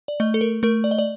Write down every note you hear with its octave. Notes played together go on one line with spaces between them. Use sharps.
D5
A3 D#5
A4
A#4
A3 A#4
D5
D#5
D5